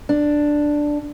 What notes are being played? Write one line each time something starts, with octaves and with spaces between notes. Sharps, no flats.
D4